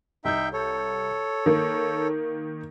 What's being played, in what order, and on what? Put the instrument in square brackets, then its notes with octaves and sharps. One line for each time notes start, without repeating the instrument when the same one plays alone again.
[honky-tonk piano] C2 G6 [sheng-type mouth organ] D#4 E5 G5
[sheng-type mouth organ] A4 C#5
[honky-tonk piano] D#3 A#3